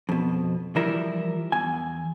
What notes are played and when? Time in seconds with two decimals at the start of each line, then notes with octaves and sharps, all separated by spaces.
0.09 F2 B2
0.76 E3 F3 G3 E4 A#4
1.52 E2 G#5